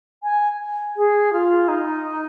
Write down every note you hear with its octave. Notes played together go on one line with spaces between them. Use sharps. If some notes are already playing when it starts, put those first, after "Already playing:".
G#5
G#4
F4
D#4